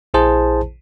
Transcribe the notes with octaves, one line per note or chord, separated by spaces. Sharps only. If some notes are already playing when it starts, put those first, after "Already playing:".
A#1 E4 G#4 C5 A5